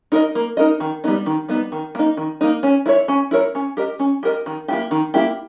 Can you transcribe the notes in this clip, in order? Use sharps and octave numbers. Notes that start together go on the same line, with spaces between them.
D#4 A#4 D#5
A#3
D#4 A#4 D#5
D#3
G3 B3 D#4
D#3
G3 B3 D#4
D#3
A#3 D#4
D#3
A#3 D#4
C#4
E4 A#4 C#5
C#4
E4 A#4 C#5
C#4
G4 A#4 D#5
C#4
G4 A#4 D#5
D#3
A#3 E4 G4
D#3
A#3 E4 G4